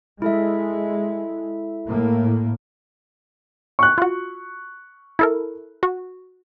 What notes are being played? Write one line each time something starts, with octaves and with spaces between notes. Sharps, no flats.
G#3 E4 A4 E5
A2 A#3
C#6 F#6
F4 F#4
E4 A4 A#4
F#4